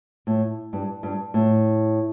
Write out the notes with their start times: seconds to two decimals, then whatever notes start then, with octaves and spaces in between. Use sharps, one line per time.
0.27 A2
0.73 G2
1.03 G2
1.34 A2